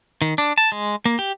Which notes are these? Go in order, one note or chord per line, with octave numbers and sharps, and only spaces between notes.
D#3
D4
A5
G#3
A#3
G4